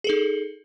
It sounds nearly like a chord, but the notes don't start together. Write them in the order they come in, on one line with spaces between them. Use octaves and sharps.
G#4 A4 D#4